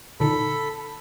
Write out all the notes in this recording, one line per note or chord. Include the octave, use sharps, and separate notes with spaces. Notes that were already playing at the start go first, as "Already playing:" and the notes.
A#2 D3 D#4 A4 B5